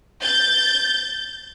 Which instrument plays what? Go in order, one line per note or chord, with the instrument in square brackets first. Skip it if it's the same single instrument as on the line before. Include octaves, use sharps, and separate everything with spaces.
[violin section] G6 A6